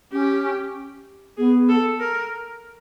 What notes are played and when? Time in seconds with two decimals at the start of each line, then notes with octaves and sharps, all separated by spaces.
0.12 C#4 G4
1.37 B3 G#4
1.69 A4
2.00 A#4